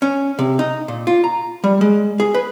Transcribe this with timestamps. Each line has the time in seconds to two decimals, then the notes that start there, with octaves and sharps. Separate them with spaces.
0.02 C#4
0.39 C3
0.59 D#4
0.88 A#2
1.07 F4
1.24 A#5
1.64 G3
1.81 G#3
2.20 G#4
2.34 B4